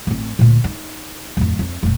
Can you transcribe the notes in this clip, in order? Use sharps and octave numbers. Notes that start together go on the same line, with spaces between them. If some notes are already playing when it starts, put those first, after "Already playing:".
A1 C4
D2 A#2
D#4
D1 F2
F2
F1 A#2